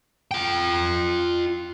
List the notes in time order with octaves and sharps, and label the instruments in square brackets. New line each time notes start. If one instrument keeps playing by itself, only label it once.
[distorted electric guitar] F4 G5